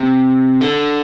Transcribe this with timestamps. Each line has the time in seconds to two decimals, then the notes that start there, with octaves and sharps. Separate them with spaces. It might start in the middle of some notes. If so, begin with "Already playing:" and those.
Already playing: C3
0.61 D3